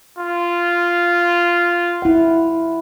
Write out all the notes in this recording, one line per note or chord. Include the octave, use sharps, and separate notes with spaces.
F4
E4 F#5